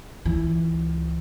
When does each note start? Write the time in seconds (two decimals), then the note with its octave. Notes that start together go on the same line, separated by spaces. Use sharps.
0.25 C#2 E3